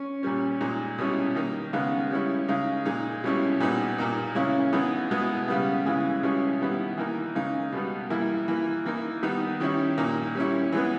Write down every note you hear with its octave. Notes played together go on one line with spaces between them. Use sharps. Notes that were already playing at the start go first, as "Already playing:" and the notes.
Already playing: C#4
A#2 G3 C#4
A#2 G#3 D#4
B2 G3 C#4 E4
D#3 A#3 D#4
C#3 G#3 B3 D#4
G3 C#4 E4
C#3 G#3 D#4
A#2 G#3 D#4
B2 G3 C#4 E4
A#2 G3 B3 D#4
A#2 A#3 D#4
C#3 G#3 C#4 E4
E3 G#3 B3 D#4
B2 G#3 B3 E4
C#3 G3 B3
C#3 E3 G#3
B2 G3 C#4 E4
D#3 G3 B3 E4
E3 A#3 D#4
C#3 G#3 D#4
B2 G3 B3
E3 G3 A#3 E4
E3 A#3 E4
E3 A#3 D#4
D#3 G3 B3 D#4
D#3 G3 C#4 E4
A#2 A#3 D#4
G3 C#4 E4
E3 G#3 B3